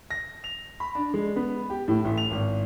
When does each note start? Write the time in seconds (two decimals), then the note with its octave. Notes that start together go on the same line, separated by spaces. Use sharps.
0.10 A#6
0.44 F7
0.80 B5
0.95 D4
1.14 G#3
1.36 B3
1.70 G4
1.88 A2
2.05 A1
2.18 F7
2.31 G#1